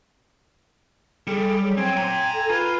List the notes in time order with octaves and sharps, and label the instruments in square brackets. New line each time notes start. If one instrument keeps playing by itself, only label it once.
[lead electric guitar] G3 [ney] G#4 [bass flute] A4
[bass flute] F#3 [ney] G#4
[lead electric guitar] C4 [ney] G5 [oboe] G#5
[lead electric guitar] A#5 C6
[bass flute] A4
[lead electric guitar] F4 [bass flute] B4 [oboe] G#5 [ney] B5